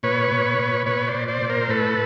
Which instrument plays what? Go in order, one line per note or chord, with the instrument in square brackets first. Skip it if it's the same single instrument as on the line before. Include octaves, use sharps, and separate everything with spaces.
[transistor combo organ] A#2 B4 C#5
A#2
A#2
A#2 B4 C#5
C5 D5
A#2
C5 D5
A#2
A#4 C5
A2 A4 B4